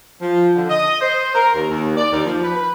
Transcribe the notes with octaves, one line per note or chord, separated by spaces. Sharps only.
F3
D3
D#5
C5
A#4
D#2
D#2
D5
D#2
F3
B4
B4